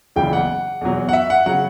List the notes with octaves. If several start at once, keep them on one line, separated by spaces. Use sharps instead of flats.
F#1 E2 C#3 E3 G5
F#5
E2 B2 F#3
F#5
E5
F#5
C#3 F#3 F#5